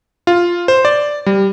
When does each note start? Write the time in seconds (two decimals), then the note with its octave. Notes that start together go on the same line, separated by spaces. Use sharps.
0.27 F4
0.68 C5
0.85 D5
1.26 G3